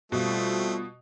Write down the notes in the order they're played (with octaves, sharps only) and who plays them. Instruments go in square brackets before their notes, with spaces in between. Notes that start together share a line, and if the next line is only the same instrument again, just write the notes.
[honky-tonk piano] B2 [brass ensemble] G3 F4 [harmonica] A3 C4